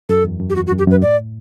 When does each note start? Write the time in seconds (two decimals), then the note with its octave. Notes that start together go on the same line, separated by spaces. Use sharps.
0.09 F#2 A4
0.25 E2
0.40 F#2
0.50 G4
0.55 E2 F#4
0.67 F#4
0.72 F#2
0.79 G4
0.87 F#2 B4
1.02 A2 D5